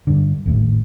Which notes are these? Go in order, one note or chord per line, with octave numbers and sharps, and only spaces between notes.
G2 D3
G#1 D#2 A2